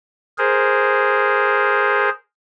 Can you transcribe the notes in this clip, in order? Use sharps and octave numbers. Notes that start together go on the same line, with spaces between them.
G#4 A#4 C5